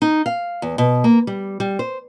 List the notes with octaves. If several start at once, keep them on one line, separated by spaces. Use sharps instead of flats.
D#4
F5
E2
B2
A#3
G3
G3
C5